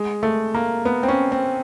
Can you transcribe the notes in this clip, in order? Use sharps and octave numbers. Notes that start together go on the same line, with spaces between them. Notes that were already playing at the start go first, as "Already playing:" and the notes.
Already playing: G#3
A3
A#3
B3
C4
C#4
C4